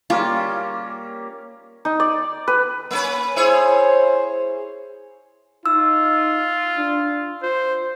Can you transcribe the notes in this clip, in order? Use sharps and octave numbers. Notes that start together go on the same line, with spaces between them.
G3 A#3 C#4 F4
D#4
D5
B4
A#3 C#4 B4
E4 G#4 C5 C#5
D#4 F4 E6
D4
F4 C5